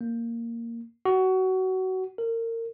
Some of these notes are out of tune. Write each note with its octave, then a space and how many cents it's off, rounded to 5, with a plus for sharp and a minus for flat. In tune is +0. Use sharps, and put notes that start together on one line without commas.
A#3 -5
F#4 +20
A#4 -30